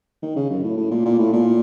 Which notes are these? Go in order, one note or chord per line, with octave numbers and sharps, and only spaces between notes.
D#3
C#3
F#2
A2
A2
A#2
A#2
A2
A#2